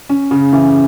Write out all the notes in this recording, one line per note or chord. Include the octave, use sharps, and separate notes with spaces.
C#4
C#3
E3